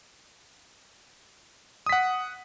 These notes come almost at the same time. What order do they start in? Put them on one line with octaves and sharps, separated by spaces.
D#6 B6 F#5